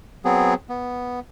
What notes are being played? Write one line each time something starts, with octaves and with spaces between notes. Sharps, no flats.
F#3 B3 C4 G#4
B3